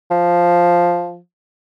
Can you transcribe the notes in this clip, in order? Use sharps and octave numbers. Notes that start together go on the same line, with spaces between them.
F3